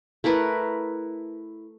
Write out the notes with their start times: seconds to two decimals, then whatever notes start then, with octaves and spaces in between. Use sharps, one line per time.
0.24 A3 E4 A#4 B4